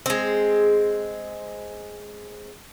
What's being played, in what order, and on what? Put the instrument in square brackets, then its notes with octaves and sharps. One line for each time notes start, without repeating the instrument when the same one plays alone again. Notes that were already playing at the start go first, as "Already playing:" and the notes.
[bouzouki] G#3 C4